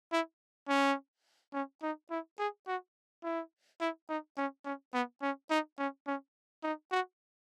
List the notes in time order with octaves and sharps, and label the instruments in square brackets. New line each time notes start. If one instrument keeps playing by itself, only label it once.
[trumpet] E4
C#4
C#4
D#4
E4
G#4
F#4
E4
E4
D#4
C#4
C#4
B3
C#4
D#4
C#4
C#4
D#4
F#4